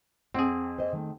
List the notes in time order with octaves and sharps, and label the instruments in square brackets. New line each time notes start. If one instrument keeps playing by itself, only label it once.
[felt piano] F2 [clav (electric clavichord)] C4 G#4 [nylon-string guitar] F#5
[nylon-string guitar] C5 D#5
D#3 A3